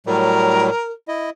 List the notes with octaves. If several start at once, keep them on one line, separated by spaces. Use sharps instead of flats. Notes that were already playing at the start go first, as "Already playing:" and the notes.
A2 F#3 G3 A#4
E4 D#5